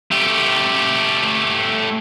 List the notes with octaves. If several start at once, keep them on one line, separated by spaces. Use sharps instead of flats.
A3 G4